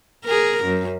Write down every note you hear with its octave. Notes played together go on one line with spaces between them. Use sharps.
G#4 A#4
F#2